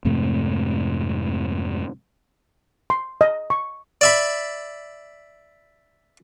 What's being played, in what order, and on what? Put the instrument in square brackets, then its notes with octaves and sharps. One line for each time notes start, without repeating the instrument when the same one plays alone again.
[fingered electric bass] F2 G#2 C3 A3
[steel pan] C6
D#5
C#6
[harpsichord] D5 E5 B5